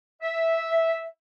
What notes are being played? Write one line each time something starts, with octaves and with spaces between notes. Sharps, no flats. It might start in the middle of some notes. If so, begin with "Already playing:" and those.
E5